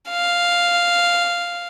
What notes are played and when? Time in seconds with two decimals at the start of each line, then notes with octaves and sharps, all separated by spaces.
0.10 F5